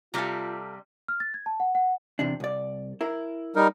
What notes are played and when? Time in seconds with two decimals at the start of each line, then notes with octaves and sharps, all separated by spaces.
0.14 C3 G3 F4 A4 F5 A#5
1.08 F6
1.20 A6
1.34 G#6
1.46 A5
1.60 F#5
1.75 F#5
2.19 E2 C3 D4
2.40 C2 D5
3.01 E4 A#4
3.56 G3 D#4 A#4